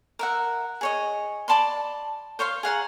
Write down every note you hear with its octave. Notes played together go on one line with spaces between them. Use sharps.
A#4 E5 F#5
G#4 C#5 D#5
D5 A5 B5 C6
C5 C#5 F5 C6
G#4 F5 F#5 A#5